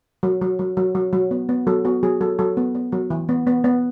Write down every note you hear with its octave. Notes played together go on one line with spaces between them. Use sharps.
F#3
F#3
F#3
F#3
F#3
F#3
B3
B3
F#3 A4
B3 F#4
F#3 G#4
F#3 A4
F#3 A4
B3
B3
F#3
E3
B3
B3
B3